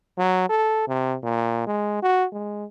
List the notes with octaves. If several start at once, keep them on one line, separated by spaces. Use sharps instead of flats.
F#3
A4
C3
A#2
G#3
F#4
G#3